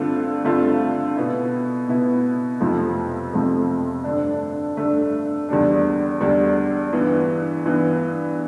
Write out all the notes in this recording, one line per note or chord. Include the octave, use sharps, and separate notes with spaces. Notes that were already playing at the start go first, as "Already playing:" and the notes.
Already playing: G2 D3 A3 C4 F4
G2 D3 A3 C4 F4
B2 B3 E4
B2 B3 E4
F2 C3 F3 A3 C4
F2 C3 F3 A3 C4
G2 D3 A3 D4
G2 D3 A3 D4
E2 D3 G3 D4
E2 D3 G3 D4
G2 E3 B3
G2 E3 B3